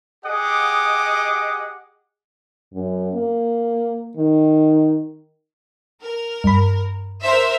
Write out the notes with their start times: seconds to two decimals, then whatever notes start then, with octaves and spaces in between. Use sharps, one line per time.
0.24 G4 G#4 D#5 F#5 D6
2.73 F#2
3.15 A#3
4.17 D#3
6.03 A#4
6.44 G2 B5
7.23 A#4 C5 E5